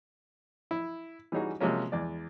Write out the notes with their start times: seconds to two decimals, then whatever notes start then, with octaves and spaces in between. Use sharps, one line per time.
0.71 E4
1.32 E3 G3 C#4 D#4 F#4 G#4
1.61 C3 F3 F#3 G#3 A#3 C#4
1.92 E2 G#3 D5